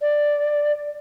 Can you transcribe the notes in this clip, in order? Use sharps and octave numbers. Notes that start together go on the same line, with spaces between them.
D5